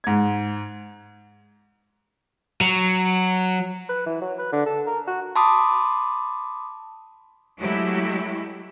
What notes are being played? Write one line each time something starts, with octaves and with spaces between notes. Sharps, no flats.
G#2 G#6
F#3
B4
E3
F#3
B4
D3
A4
A#4
F#4
A5 B5 C6 D6 D#6
F#3 G#3 A3 E4 G4